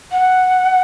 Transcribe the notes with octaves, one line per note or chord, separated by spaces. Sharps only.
F#5